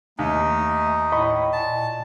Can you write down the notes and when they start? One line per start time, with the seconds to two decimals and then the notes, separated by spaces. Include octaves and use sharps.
0.19 D#2 A3 D#4
1.12 A2 D#5 B5 C#6
1.53 A#2 A5